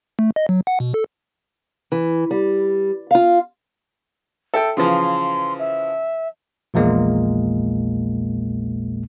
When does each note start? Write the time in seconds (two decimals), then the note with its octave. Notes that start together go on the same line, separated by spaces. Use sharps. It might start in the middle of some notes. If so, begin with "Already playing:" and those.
0.19 A3
0.36 D#5
0.49 F#3
0.67 F#5
0.80 B2
0.94 A4
1.92 E3
2.31 G3
3.11 F4 F5
4.54 A4 E5 G5
4.77 C#3 E3 F3 C6
5.59 E5
6.74 A#1 E2 A#2 G#3 A#3